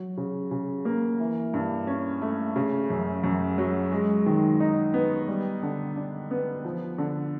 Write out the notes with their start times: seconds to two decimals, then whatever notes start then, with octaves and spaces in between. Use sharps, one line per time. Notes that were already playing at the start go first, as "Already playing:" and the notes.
Already playing: F#3
0.17 C#3
0.51 C#3
0.85 A#3
1.20 E3
1.54 G2
1.87 C#4
2.22 A3
2.56 C#3
2.90 F#2
3.24 F#2
3.58 F#3
3.92 G#3
4.26 D#3
4.60 D#4
4.94 B3
5.28 G3
5.63 D3
5.96 D4
6.31 B3
6.64 F3
6.98 D3